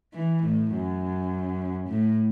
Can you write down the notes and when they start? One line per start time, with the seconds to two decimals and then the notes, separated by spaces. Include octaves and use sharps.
0.13 E3
0.43 A2
0.72 F#2
1.89 A2